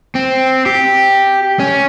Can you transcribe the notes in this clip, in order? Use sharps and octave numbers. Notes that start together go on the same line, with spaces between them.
C4
G4
C#4